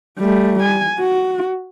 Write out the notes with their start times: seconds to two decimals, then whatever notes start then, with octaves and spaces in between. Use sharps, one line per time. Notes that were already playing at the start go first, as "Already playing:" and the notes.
0.19 G3 A3
0.62 G#5
0.99 F#4